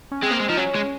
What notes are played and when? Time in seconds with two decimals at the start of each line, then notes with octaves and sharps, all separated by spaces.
0.11 C#4
0.22 G#3 C4
0.31 A#3
0.40 G#3
0.49 F3 D#4
0.57 F#3 C#4
0.75 G#3